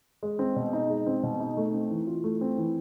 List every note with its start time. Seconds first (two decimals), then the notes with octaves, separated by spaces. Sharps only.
0.23 G#3
0.39 C4
0.56 B2
0.73 D#4
0.90 G#3
1.07 C4
1.23 B2
1.40 D#4
1.57 A3
1.74 C4
1.91 E3
2.07 F4
2.24 A3
2.41 C4
2.58 E3